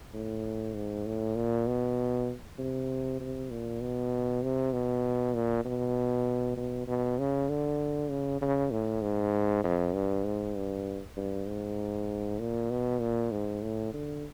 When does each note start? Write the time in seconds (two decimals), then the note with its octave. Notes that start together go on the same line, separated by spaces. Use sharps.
0.14 A2
0.75 G#2
1.06 A2
1.36 A#2
1.67 B2
2.59 C3
3.20 C3
3.51 A#2
3.81 B2
4.43 C3
4.73 B2
5.34 A#2
5.65 B2
6.57 B2
6.88 B2
7.19 C#3
7.50 D3
8.10 C#3
8.42 C#3
8.71 A2
9.02 G#2
9.64 F2
9.94 G2
10.25 G#2
10.55 G2
11.17 G2
11.48 G#2
12.39 A#2
12.70 B2
13.01 A#2
13.31 G#2
13.63 A2
13.93 D3